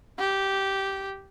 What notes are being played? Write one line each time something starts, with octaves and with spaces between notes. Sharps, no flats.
G4